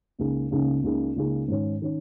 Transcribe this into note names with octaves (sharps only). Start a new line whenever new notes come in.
C#2 C#3 A#3 D#4 G#4
C#2 C#3 A#3 D#4 G#4
C#2 C#3 A#3 D#4 G#4
C#2 C#3 A#3 D#4 G#4
G#2 D#3 C#4
D#3 C#4